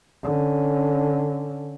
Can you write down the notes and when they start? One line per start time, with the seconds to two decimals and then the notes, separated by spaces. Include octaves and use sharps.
0.23 D3 C#4